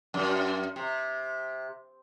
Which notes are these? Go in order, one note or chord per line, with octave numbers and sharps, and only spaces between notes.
F#2
C3